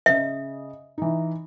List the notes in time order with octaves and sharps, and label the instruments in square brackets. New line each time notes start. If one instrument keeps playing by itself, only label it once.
[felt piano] C#3 D#5 [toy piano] E5
[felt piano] E3 D#4